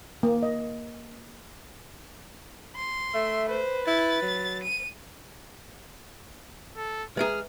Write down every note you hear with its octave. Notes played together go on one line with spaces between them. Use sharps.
A#3
D#5
C6
A3 E5
B4 C5
E4 A6
F#3
D#7
A4
G#3 G#4 B4 E5 A#5 F6